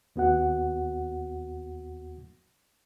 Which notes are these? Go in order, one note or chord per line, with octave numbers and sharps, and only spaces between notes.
D#2 B3 F#4 F#5